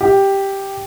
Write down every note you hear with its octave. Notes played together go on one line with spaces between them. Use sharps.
G4